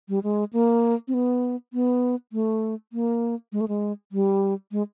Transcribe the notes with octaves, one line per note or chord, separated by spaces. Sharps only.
G3
G#3
A#3
C4
B3
B3
A3
A#3
G#3
A3
G#3
G3
G#3